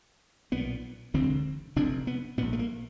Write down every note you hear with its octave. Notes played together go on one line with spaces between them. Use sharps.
B1 A#2 B3
E1 D2 D3 C4
F1 F2 C3 D4
B3
A#1 A#2 B3
A3
A#3